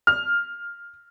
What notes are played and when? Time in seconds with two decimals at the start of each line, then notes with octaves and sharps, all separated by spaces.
0.07 F6